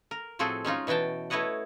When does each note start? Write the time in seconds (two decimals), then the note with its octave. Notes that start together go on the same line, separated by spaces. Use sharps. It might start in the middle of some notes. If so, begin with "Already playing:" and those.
0.11 A#4
0.39 A2 F3 C4 F#4 G#4 A4
0.65 G#3 C#4 D#4 F4
0.87 B2 E3 F#4 G5 A5
1.30 A3 E4 B4 C#5 D#5 F#5